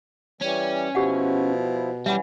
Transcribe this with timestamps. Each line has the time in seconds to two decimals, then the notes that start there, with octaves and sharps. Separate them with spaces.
0.41 E3 G3 C#4
0.95 B2 F3 E4 G4 F#5
2.06 E3 G3 C#4 E5 F#5 B5